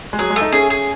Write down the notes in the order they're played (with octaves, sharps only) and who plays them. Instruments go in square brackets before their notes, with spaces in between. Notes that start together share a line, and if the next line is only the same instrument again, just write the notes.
[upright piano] G#3
[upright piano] F#3 [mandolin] G#4
[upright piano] G#3
[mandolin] A3
[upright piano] D#4
[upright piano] C#4 [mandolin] G#4
[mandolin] G#4